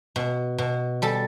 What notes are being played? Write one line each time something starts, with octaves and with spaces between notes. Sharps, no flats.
B2
B2
G3 A4